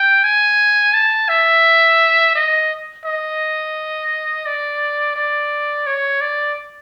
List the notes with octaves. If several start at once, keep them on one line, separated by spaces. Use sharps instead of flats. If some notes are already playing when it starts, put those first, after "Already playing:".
Already playing: G5
G#5
A5
E5
D#5
D#5
D5
D5
C#5
D5